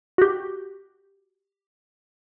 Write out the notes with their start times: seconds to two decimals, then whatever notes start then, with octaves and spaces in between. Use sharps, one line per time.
0.18 F#4 G4